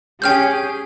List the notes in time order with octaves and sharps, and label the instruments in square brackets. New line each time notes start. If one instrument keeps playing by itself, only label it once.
[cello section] C#4 G4 G#4 [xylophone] G5 F6 G6